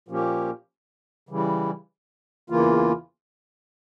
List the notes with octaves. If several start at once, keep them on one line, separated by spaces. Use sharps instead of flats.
A#2 F3 A#3 C#4 G4
C#3 E3 G3
E2 C#3 E3 A#3 F4